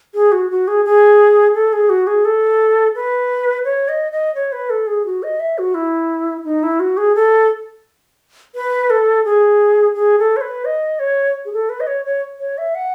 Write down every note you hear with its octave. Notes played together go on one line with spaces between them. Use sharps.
G#4
F#4
F#4
G#4
G#4
A4
G#4
F#4
G#4
A4
B4
C#5
D#5
D#5
C#5
B4
A4
G#4
F#4
D#5
E5
F#4
E4
D#4
E4
F#4
G#4
A4
B4
A4
G#4
G#4
A4
C#5
B4
D#5
C#5
G#4
A4
B4
D#5
C#5
C#5
C#5
E5
F#5